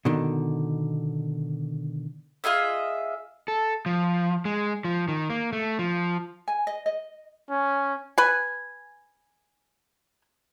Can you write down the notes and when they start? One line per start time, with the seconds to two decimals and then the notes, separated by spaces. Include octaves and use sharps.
0.05 B2 D3 D#3
2.44 F4 G#4 D#5 E5
3.48 A4
3.86 F3
4.45 G#3
4.85 F3
5.08 D#3
5.30 A#3
5.53 A3
5.79 F3
6.48 G#5
6.67 D#5
6.86 D#5
7.50 C#4
8.18 B4 G#5